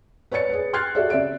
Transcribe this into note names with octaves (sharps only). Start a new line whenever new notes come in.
B4 C#5 D5 A6 C#7
G#4 B4
C6 F6 F#6 G#6 A6 C7
F#4 G4 A4 D5 E5
C#3 D5 E5 D7